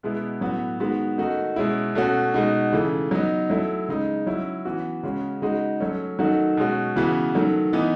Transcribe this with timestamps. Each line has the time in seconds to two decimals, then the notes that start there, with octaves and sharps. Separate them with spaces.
0.03 B2 G#3 B3 E4
0.41 A2 F#3 B3 F#4
0.80 D#3 G#3 B3 F#4
1.18 D#3 A3 D#4 F#4
1.56 B2 G#3 C#4 E4
1.95 B2 A3 C#4 F#4
2.34 B2 G#3 D#4 F#4
2.72 C#3 E3 A3
3.11 F#3 B3 D#4
3.50 F#3 A3 E4
3.89 C#3 G#3 D#4
4.27 F#3 C#4 E4
4.65 E3 B3 F#4
5.03 C#3 G#3 C#4 F#4
5.42 C#3 G#3 D#4 F#4
5.80 F#3 A3 C#4
6.19 D#3 F#3 A3 D#4 F#4
6.57 B2 G#3 C#4 F#4
6.96 C#3 E3 B3 F#4
7.35 D#3 F#3 A3
7.73 E3 B3 D#4